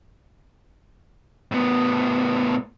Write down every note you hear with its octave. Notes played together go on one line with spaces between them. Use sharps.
A2 B3